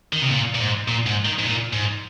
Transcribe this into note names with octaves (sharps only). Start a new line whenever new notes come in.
D#3
C3
A#2
A#2
G#2
A#2
G#2
D#3
G#2
A#2
G#2